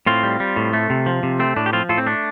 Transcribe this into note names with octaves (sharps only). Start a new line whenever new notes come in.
A2 C4 F4
G3
G3
A2
A3
C3
F3
C3
A3 C4
A2 D4
G4
F3 C4 F4
A2 F4 A4
C4
A3 D4